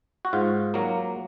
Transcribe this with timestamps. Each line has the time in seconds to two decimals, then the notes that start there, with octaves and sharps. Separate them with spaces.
0.25 F#4
0.33 G#2 F4
0.74 F#3 A#3